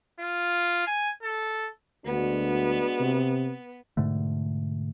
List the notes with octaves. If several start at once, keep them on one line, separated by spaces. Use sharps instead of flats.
F4
G#5
A4
D2 G#3 B3 D4 F#4
C3
G#2 B2 D3 A3